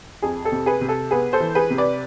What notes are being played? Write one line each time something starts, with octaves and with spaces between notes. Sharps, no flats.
F2 G#4
A4
C3
G#4 B4
C3
A4
B3 G#4 B4
A4 C5
E3
G#4 B4
C3
B4 D5